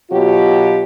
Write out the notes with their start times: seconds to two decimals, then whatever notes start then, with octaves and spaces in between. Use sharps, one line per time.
0.10 B2 F#3 F4 G4